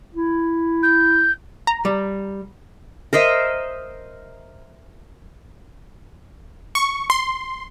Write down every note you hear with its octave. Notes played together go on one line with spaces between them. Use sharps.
E4
G6
A#5
G3
A#4 C5 D#5 E5
C#6
C6